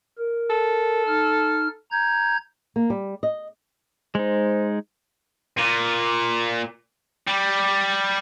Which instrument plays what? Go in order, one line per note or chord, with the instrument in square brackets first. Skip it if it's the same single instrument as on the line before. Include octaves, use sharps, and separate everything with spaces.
[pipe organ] A#4
[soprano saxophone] A4
[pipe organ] D#4 F6
A#5 G6 G#6
[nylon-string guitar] A#3
G3
D#5
[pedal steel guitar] G#3 D#4 [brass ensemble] C5
[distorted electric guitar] A#2
G3